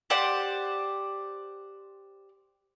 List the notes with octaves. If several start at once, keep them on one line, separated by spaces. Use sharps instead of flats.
G4 C5 D5 F#5